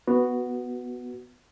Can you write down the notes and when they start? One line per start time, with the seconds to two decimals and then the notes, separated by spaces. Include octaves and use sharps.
0.07 B3 F#4